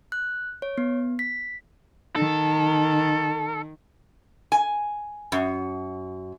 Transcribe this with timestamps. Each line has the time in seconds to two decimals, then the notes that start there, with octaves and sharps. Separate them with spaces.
0.12 F#6
0.62 C#5
0.78 B3
1.19 B6
2.16 D#3 A4
4.52 G#5
5.32 F#2